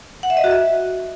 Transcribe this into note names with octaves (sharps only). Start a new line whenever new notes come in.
F#5
E5
D#5
F#4
E5